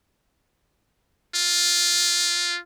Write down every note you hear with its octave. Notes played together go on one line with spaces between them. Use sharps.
F4